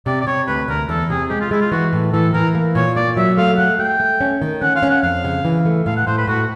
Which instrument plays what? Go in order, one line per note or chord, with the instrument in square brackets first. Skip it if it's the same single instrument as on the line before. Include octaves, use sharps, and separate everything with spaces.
[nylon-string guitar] C3 [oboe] D5
[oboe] D5
[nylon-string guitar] C3 [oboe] C#5
[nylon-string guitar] D2 [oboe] B4
[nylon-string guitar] D2 [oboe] A#4
[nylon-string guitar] E2 [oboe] A4
[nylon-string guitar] C3 [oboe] G#4
[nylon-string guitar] G#3 [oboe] G4
[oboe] F4
[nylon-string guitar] G#3 [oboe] E4
[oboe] F4
[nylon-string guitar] E3 [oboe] F#4
[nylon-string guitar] A2
[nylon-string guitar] E3 [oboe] A4
[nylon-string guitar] E3 [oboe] A#4
[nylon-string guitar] A#3
[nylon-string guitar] A#2 [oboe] C#5
[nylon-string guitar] A#3 [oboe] D5
[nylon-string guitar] F#3 [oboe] E5
[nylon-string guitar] A3 [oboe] F5
[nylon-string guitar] A3 [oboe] F#5
[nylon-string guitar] A3 [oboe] G5
[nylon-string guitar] A3
C#4
D#3
[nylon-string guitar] C#4 [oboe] F#5
[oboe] F5
[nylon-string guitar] C#4
[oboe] F#5
[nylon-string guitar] F2 [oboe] F5
[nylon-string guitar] C#3
E3
A3
[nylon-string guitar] A2 [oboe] F5
[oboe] F#5
[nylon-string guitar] A2 [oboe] C5
[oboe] B4
[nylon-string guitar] A2 [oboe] F#4